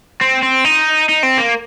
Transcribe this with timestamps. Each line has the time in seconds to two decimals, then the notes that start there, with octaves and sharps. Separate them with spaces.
0.21 C4
0.43 C4
0.65 D#4
1.09 D#4
1.23 C4
1.38 A#3